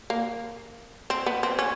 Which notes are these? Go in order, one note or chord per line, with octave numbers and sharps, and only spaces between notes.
A#3
C4
B3
C4
C#4